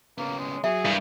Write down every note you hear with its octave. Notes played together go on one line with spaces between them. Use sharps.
C#3 A#3 B3
G#3
F#3 G#4 E5
G2 E4 A#4